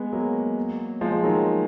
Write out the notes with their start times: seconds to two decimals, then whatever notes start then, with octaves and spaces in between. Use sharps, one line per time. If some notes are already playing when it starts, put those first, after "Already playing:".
Already playing: G#3 B3
0.12 F#3 A#3
1.01 F3 G#3
1.23 D#3 F#3